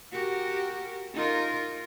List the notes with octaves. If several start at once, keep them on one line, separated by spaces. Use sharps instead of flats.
F#4 G4 A#4
D#4 F4 A#4